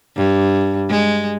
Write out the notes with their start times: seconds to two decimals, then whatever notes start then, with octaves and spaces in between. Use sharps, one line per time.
0.17 G2
0.89 G#3